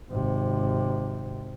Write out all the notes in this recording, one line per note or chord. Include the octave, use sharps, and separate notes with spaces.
G#1 C3